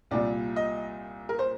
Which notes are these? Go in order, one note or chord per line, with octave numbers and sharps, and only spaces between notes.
C2 A#2 G3 D5
D#5
A#4
C5